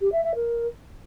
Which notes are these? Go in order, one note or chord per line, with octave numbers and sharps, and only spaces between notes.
G4
E5
E5
A#4